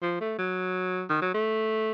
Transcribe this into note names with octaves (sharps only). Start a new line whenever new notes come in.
F3
A3
F#3
D#3
F#3
A3